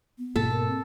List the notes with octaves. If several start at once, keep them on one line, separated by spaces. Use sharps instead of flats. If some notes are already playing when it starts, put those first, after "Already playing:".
B3
G#2 B2 A#3 A4
A#4
C4